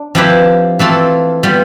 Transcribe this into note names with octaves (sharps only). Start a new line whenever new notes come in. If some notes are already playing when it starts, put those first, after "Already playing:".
Already playing: D4
F3 C4 E4 G4 B4
E3 A3 C4 F4 A4
G3 B3 F4